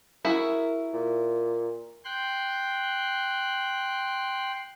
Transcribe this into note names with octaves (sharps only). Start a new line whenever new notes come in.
E4 F#4 G#4 A#4
A#2
G5 C6 F#6